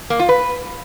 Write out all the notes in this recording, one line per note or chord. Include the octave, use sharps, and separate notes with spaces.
A#3
F4
B4